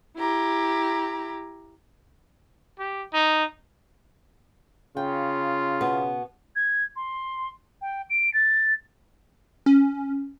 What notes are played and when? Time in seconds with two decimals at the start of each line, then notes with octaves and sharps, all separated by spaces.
0.17 E4 G4 A#5
2.79 G4
3.14 D#4
4.97 C#3 F4 G5
5.81 B2 B3
6.56 G#6
6.96 C6
7.82 G5
8.10 D7
8.34 A6
9.66 C#4